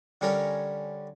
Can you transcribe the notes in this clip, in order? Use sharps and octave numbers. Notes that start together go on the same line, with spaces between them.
D3 G3 C#4 A#4 C#5 A#5